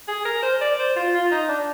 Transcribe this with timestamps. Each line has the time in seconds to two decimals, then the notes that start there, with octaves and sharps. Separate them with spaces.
0.08 G#4
0.25 A#4
0.42 C5
0.61 D5
0.79 C5
0.96 F4
1.14 F4
1.31 D#4
1.49 D4